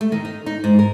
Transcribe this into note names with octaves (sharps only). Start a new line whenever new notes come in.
A3
D#3
D#4
D#4
G#2
A#4